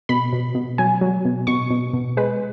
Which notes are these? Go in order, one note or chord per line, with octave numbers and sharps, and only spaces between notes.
B2 B5
B2
B2
F#3 G#5
F#3
B2
B2 C#6
B2
B2
G#3 B4